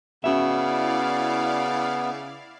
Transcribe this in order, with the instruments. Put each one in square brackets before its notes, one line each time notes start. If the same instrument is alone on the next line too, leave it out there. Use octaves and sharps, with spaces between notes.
[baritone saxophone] C#3 [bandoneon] B3 [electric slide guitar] C#4 F#4 E5 [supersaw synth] E4 D5 F5